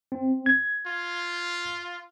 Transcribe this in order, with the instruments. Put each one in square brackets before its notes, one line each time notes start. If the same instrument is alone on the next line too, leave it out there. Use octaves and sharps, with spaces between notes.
[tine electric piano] C4
G#6
[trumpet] F4